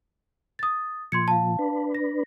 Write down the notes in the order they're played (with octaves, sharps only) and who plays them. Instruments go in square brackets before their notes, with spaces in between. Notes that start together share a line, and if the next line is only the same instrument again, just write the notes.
[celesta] D#6 A6
[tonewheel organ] A#2 F3 [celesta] C6 G#6 C#7
[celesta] F5 A5
[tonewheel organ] D4 B4
[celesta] A#6